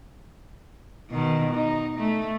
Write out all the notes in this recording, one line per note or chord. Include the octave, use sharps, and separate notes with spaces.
B2 D#3
D#4
A3